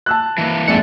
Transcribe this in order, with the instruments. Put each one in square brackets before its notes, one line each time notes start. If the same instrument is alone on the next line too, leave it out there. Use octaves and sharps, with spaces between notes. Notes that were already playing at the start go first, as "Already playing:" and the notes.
[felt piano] A5 E6 F#6
[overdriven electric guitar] E3 A#3 [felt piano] A5
[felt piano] A#1 F2 G#2 [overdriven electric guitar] A4 F#5